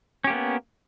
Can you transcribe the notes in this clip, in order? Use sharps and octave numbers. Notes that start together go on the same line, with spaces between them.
A#3 B3 C#4 G4